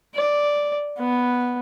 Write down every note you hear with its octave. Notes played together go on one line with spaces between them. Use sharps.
D5
B3